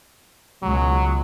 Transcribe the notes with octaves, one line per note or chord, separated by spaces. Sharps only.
C#2 B2 F#3 G#3